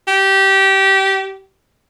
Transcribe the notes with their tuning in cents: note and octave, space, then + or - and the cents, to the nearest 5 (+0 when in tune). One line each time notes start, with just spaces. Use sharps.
G4 -20